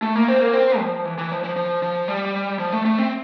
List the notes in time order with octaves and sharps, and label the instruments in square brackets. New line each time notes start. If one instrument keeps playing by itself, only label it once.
[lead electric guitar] A3
A#3
C4
A#3
C4
F3
E3
E3
F3
F3
F3
F3
G3
F3
A3
A3
C4